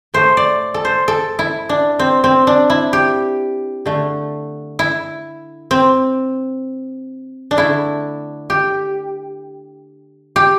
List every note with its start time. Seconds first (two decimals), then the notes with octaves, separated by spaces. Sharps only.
0.14 A2 A3 C5
0.37 D5
0.74 A4
0.85 C5
1.08 A4
1.39 E4
1.69 D4
1.99 C4
2.24 C4
2.47 D4
2.70 E4
2.93 G4
3.86 D3 A3
4.79 E4
5.71 C4
7.51 D4
7.57 D3 A3 E4
8.50 G4
10.36 G4